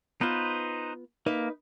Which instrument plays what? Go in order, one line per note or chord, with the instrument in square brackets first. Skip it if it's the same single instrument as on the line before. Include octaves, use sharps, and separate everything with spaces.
[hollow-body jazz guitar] B3 F4 [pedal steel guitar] D#4 B4 C5
[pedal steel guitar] A#3 [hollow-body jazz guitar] D#4 B4 E5